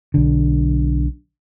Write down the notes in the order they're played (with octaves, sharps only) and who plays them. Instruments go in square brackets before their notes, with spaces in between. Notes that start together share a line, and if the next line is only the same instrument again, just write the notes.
[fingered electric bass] B1 D3